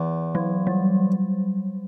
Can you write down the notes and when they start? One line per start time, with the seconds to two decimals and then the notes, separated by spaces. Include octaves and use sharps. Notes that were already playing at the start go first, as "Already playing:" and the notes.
Already playing: E2
0.35 F#3
0.67 G3